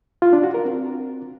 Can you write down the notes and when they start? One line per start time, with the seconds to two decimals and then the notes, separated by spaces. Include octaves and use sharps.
0.22 F4
0.33 D4
0.44 F#4
0.54 A#4
0.65 C4